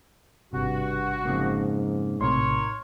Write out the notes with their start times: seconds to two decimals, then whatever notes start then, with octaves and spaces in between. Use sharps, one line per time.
0.53 G#1 G2 C3 F#4
1.25 F2 G#2 C#3 A#3
2.21 A#1 A2 C3 D#4 A#4 C#5 C6